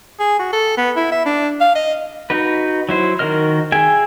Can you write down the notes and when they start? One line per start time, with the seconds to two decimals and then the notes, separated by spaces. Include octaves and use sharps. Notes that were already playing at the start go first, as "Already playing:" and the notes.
0.20 G#4
0.39 F#4
0.53 A4
0.77 B3
0.96 E4
1.12 E5
1.26 D4
1.61 F5
1.75 D#5
2.30 D#4 F#4 B4
2.89 F#3 E4 C5
3.19 D#3 F#4 A#4 D#5 F6
3.72 G#4 E5 G5 G#5